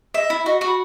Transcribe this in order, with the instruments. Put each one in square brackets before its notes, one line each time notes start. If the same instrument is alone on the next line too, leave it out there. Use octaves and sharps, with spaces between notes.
[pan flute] D#5 [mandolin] E5
[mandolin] E4
[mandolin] F#4 [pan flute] D#5
[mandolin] F#4
[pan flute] B5